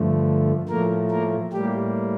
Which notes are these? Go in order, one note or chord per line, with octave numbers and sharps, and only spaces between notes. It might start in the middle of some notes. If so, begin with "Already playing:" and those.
Already playing: G2 D3 F3 A3
A2 F3 A3 A#3 A#4
A#3 A#4
A2 G3 A#3 G4